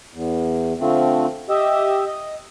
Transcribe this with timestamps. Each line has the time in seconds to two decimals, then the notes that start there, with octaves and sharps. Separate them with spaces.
0.13 E2
0.80 D3 F3 A3 C4
1.49 G4 D#5 E5
2.07 D#5